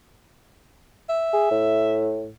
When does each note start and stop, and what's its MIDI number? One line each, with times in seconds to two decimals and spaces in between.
1.09 2.13 76
1.33 1.46 68
1.51 2.31 45